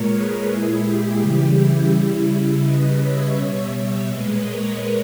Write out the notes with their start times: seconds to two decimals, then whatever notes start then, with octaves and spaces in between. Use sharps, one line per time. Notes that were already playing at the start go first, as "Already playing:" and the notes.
Already playing: A#2 G#3 A#4 C#5
0.10 G#4 B4
0.46 A#2 G#3 E4 G#4
0.82 G4
1.19 C#3 E3 G3
1.55 E4
1.90 C#3 G3
2.62 C#3 G3 B4 D#5
2.99 C#5 E5
3.35 B2 G3 C#5 E5
4.07 A#2 G#3 B4 D#5
4.43 A#4 C#5